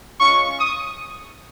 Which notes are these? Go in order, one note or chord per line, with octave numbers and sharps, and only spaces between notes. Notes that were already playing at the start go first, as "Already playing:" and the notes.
G#3 C#4 F4 C#6
D#6